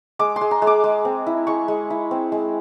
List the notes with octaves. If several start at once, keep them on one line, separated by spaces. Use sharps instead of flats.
G#3 D6
C6
G#3
A#5
G#3
D6
G#3
C4
E4
G#3 C#6
G#3
E4
C4
G#3